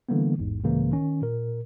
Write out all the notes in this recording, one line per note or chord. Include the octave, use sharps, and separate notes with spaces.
D3 E3 G3 A#3 B3
A1 E2 G#2
C#2 A2 C#3 E3 A#3
D#3 C#4
A#2 A#4